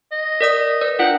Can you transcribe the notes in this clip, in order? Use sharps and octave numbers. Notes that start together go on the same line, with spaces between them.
D#5
A#4 D5 D#6
B4 D5
D4 F4 A#4 F#5